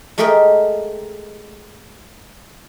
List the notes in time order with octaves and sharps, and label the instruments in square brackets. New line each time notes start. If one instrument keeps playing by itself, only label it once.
[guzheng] G#3 A3 G4 G#4 A#4 D#5